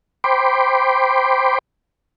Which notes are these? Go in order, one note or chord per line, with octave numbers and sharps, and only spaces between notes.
C5 G5 B5 C6 D6